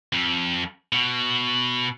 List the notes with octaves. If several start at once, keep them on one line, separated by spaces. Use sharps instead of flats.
F2
B2